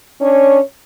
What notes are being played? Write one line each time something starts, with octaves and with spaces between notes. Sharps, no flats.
C#4 D4 C#5